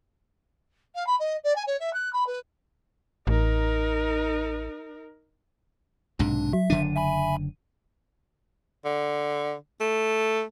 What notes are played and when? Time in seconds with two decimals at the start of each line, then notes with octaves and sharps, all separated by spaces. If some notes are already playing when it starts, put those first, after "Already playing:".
0.94 F5
1.06 B5
1.19 D#5
1.43 D5
1.55 G#5
1.66 C#5
1.79 E5
1.93 F#6
2.13 B5
2.26 B4
3.27 A1 D#4 A#4
6.19 B1 G#2 C3 D4
6.53 F#3 E5
6.70 F#1 D3 D4 D#7
6.96 E5 G#5 B5
8.85 D3
9.81 A3